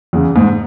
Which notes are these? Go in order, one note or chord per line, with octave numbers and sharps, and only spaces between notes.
E2 C#3
G#2